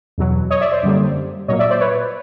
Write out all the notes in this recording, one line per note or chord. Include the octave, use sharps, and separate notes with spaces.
E2 B2 F#3
C#5 D#5
D5 E5
C5 D5
F#2 D3 G3 A#3
A#2 F#3 A#3 C#5 D#5
D5 E5
C5 D5
B4 C#5